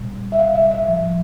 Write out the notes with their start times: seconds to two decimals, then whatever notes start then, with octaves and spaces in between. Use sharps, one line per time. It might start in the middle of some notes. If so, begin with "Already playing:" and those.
Already playing: A#2 G3
0.32 E5
0.38 C3 F5
0.42 G3
0.55 E5
0.71 E5
0.87 A2 F3